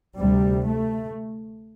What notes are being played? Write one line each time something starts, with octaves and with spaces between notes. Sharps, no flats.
D2 C3 G3
A3